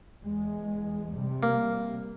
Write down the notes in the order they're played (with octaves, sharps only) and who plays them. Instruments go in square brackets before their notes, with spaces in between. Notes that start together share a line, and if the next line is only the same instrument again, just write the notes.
[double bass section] E2 G#3
C3 G3
[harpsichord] A#3